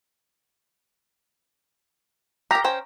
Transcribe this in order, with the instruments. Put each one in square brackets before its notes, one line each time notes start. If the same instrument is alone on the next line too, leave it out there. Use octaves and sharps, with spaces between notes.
[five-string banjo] G4 A#4 [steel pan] A#5
[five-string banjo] C#4 C5 G5